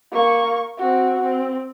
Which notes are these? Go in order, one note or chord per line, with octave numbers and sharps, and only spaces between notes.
A#3 C#6
C4 F#4
C4